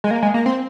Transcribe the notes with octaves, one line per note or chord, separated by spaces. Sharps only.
G#3
A#3
G#3
A#3
C4